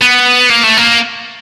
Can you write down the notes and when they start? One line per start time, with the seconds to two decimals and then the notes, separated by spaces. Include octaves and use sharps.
0.02 B3
0.50 A#3
0.63 A3
0.77 A#3